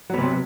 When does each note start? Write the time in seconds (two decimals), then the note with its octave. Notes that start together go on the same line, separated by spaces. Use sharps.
0.10 F#3
0.14 B3
0.18 C3